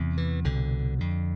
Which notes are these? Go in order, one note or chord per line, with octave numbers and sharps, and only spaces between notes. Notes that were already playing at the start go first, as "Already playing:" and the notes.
Already playing: E2 C3
E3
C2 B2 D3
F2 D3